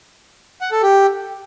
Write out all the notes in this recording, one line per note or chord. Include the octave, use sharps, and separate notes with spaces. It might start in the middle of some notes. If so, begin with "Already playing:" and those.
F#5
A4
G4